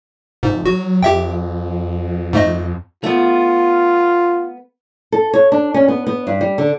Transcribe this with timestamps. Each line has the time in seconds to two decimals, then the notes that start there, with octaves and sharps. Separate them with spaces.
0.43 F1 G#2
0.66 F#3 F#4
1.03 F2 G4 E5 G5
2.33 G#2 A3 D#5
3.04 A3 B3 F4
5.12 A4
5.33 C#5
5.52 D4
5.74 C#4
5.88 B3
6.07 B3
6.27 G2
6.41 G3
6.58 D3